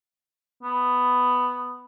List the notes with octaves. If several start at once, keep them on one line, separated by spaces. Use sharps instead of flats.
B3